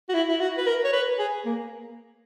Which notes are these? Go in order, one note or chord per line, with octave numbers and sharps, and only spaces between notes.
F#4
E4
E4
F#4
B4
A#4
C#5
B4
G#4
A#3